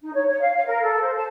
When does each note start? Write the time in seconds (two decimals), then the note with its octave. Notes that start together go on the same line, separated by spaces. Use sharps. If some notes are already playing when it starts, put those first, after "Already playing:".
0.02 D#4
0.13 C#5
0.27 C#5
0.40 F5
0.54 F5
0.66 A#4
0.81 A4
1.01 C5
1.15 A5